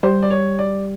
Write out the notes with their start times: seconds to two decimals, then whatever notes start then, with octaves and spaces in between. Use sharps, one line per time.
0.03 G3 C5
0.22 D5
0.30 C#5
0.59 D5